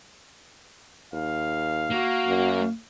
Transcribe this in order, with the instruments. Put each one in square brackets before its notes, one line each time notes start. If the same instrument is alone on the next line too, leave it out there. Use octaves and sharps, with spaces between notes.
[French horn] D#2 [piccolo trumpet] F5
[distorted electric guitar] A#3 [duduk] F#4
[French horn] F#2